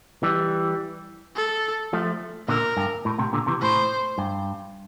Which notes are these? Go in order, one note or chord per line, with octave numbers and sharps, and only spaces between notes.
E3 G3
A4
F3 A3
A#2 D3 A#4
G2
A2
A2 C3
A#2 D3
C3 E3
A2 C5
G2